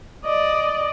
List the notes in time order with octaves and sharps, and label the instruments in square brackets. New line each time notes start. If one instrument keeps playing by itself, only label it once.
[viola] D5 D#5